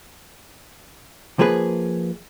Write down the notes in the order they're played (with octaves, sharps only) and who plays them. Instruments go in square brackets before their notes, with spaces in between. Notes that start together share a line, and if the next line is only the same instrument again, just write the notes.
[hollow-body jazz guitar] F3 A#3 G#4 B4